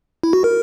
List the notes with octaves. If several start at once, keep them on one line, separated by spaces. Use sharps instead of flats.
E4
F#4
A#4